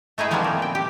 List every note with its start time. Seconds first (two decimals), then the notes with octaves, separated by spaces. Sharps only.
0.18 A3 D#4 E4 G#4 B4
0.31 E3 F3 G3 B3 C4 D#4
0.44 A#2
0.62 G5
0.75 G4